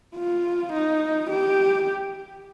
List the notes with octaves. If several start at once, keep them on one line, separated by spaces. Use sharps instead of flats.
F4
D#4
G4